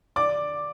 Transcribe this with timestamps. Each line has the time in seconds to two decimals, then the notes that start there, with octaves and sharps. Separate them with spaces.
0.16 D5 D6